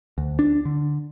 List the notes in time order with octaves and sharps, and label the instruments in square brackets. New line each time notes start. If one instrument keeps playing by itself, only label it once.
[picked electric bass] D2
D4
D3